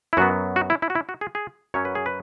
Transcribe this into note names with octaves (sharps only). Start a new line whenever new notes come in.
E4
F#2 F#3 B3 F#4
F#4
E4
E4
F#4
E4
F#4
G#4
G#4
F#2 F#3 C#4 C#5
B4
G#4
B4